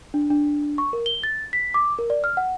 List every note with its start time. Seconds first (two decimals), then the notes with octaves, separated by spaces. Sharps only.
0.14 D4
0.30 D4
0.78 C#6
0.93 A#4
1.06 G7
1.23 A6
1.53 B6
1.74 D6
1.99 A#4
2.10 D5
2.24 F6
2.37 F#5